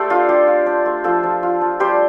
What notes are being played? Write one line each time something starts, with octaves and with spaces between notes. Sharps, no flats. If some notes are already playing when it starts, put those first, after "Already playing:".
Already playing: A3 G4 A4 C5 D5 G5
D4 F4
D4 G4
F4
D4
A3
F3 F4 A4
F3
F4
F3
G3 G4 C5